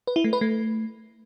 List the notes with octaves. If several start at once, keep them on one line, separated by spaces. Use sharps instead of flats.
B4
E4
A3
B4
A3